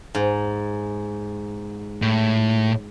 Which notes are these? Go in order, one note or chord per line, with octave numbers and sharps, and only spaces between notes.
G#2
A2